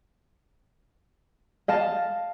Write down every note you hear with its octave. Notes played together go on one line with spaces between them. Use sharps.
D#5 F5 A5